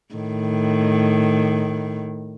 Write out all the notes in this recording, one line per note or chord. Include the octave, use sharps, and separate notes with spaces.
A2 D#3